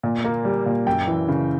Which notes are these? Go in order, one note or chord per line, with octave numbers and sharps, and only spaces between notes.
A#2
A#3
G3
A#2
F#2 G5
E3
C#3